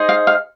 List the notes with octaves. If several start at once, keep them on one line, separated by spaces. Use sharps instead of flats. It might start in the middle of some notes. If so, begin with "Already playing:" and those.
Already playing: D#4 G#4 C5 D#5
F5
F5